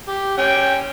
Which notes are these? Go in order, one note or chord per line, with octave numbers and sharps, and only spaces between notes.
G4
C#4 G5